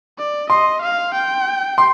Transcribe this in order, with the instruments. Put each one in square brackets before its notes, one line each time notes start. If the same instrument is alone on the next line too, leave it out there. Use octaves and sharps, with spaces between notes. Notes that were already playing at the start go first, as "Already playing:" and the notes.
[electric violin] D5
[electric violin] D#5 [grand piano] C6
[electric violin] F5
G5
[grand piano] C6